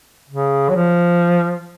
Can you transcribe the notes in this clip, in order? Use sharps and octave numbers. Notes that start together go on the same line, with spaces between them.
C#3
F#3
F3